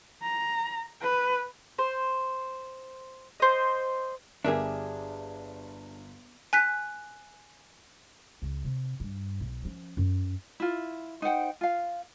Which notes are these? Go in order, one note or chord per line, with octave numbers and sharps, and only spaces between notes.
A#5
B4
C5
C5 D#5
G1 D4 G4 G#4 A#4 E5
G#5 F#6 B6
C#2
C3
G2
B1
F3 C#4
F#2
E4 F4
D#4 C5 F#5 G5
F4 F5